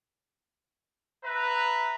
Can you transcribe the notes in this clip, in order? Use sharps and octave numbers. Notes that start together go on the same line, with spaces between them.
B4 E5 A#5